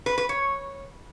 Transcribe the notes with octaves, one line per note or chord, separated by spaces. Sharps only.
B4
B4
C#5